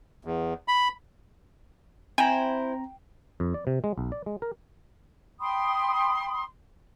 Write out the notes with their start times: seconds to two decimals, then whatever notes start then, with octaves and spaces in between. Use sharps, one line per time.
0.25 E2
0.68 B5
2.18 C4 E4 C5 G5 G#5 A#5
3.40 F2
3.54 D5
3.67 C3
3.84 G#3
3.98 B1
4.12 D5
4.26 G#3
4.42 A#4
5.39 G5 B5 C6 D#6